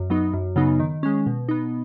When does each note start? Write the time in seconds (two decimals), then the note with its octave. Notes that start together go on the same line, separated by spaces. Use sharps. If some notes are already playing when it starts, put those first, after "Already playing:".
Already playing: F#2
0.10 F#3 B3 D#4
0.34 F#2
0.56 C#3 F#3 B3 D#4
0.80 D#3
1.03 G#3 C#4
1.26 B2
1.49 B3 D#4